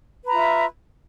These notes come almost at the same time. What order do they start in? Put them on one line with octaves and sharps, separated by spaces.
B4 A#5 F4 E5